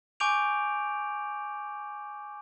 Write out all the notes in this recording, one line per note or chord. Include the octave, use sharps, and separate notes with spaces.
G#5 C#6 D6 G6 D7 F7